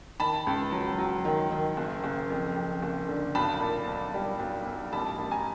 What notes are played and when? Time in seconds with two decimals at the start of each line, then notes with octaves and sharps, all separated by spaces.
0.20 D#3 A5 B5
0.47 C#2
0.72 F#3
0.99 F#3
1.25 D#3
1.51 D#3
1.77 F#1
2.04 F#1
2.30 F2
2.56 F2
2.82 F#1
3.08 D3
3.35 B1 A5 B5
3.60 A#2
3.87 B1
4.14 G3
4.39 B1
4.66 B1
4.93 A1 A5 B5
5.19 A1
5.31 G#5 A#5